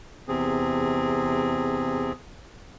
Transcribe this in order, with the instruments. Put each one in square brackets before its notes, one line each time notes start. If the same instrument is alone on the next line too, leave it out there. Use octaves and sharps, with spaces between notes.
[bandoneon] E2 C3 C4 G#4